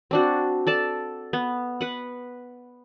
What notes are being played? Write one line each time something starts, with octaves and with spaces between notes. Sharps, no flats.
C4 D4 F#4
A4 D5 A5
B3
B4 F#5